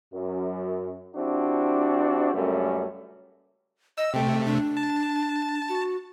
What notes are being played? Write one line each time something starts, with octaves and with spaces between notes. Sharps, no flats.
F#2
F3 C4 D4 E4 F#4 G4
C#2 F#2 G3 A3 A#3 C#4
D#5 E6
C3 A3 G5
D4
A5
F#4